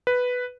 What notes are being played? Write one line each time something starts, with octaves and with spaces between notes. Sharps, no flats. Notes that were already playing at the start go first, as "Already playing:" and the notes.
B4